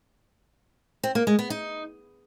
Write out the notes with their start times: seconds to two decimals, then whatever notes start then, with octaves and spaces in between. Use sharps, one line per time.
1.03 C4
1.15 A#3
1.27 G#3
1.39 B3
1.50 D#4